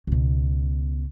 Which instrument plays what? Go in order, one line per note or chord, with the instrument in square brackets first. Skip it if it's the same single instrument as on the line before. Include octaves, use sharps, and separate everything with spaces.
[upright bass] C#2 B2